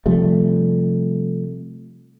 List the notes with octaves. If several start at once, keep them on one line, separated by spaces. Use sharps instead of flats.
C3 F3 G3 A3